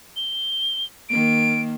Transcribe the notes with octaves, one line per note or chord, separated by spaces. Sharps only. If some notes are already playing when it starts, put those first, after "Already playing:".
G7
D#3 A#3 D7